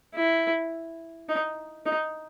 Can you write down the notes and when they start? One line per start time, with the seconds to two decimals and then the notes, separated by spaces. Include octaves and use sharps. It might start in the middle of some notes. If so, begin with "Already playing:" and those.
0.15 E4
1.29 D#4
1.86 D#4